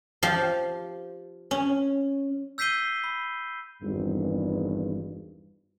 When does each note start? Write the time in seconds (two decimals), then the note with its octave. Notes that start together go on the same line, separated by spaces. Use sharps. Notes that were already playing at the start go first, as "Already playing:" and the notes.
0.23 F3 G4 C5 F5
1.51 C#4
2.58 E6 G6 B6 C7 D#7 G7
3.04 B5
3.82 G#1 E2 G2